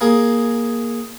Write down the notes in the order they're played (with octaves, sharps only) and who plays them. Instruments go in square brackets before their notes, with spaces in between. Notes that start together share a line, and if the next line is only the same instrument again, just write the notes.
[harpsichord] A#3 G#4